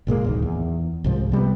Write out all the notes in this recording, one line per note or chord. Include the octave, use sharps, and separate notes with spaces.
F#1 A#2 G#3 A#3
D1 B1 D#3
E2
C2 G#2 F3
C3 G3 G#3 B3